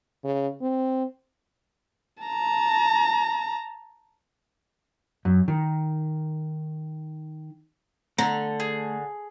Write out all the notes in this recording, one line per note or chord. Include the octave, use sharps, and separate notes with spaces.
C#3
C4
A5 A#5
F#2
D#3
D3 A3 A4 A#5
G#4